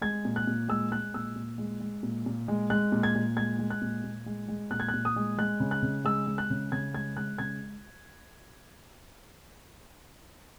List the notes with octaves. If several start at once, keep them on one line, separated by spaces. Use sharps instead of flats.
G#3 G#6
A#2
F#6
A#2
G#3 E6
G#3 F#6
A#2 E6
A#2
G#3
G#3
A#2
A#2
G#3
G#3 F#6
A#2
G#6
A#2
G#3 G#6
G#3
F#6
A#2
A#2
G#3
G#3
A#2 F#6
G#6
F#6
A#2
D#6
G#3
G#3 F#6
C#3
F#6
C#3
G#3 E6
G#3
F#6
C#3
C#3 G#6
G#3 G#6
G#3 F#6
C#3 G#6